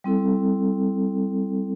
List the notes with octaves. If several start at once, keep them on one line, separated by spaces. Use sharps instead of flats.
G3 C4 E4 A4